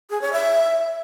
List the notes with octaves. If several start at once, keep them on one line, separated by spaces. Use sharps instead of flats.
G#4
C#5
E5